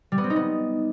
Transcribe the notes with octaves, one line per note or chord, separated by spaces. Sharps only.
G3
B3
C4
D#4
B3